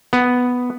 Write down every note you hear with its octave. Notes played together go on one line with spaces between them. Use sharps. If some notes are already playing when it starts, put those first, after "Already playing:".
B3